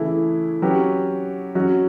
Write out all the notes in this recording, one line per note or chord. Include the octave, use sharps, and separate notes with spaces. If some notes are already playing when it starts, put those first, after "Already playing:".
Already playing: C#3 E3 A3 E4
F#3 C#4 G4 B4
F#3 C#4 F#4